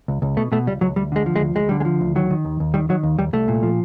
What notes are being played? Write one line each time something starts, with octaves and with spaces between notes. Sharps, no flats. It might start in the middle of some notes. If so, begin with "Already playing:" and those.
C#2
C#2
B2 A3
B2 A3
C#2 G3
C#2 F#3
D2 G3
D3 G#3
F3
G#3
D2
D2 G#3
D3 G3
G#3
F3
D2
D#3 F#3
D#3
D#2
D#2
D#3 G3
D#3 F#3
D#2
D#2 G3
C2 A3
A#2
F3